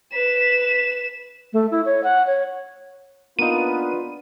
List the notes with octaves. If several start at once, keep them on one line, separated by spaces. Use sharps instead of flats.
B4 B6 E7
A3
E4
C#5
F#5
C#5
A#3 B3 D4 D#4 F4 B4 D#7